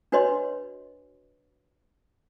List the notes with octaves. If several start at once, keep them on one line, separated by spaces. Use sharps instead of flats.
D4 F#4 B4 C#5 D#5 C6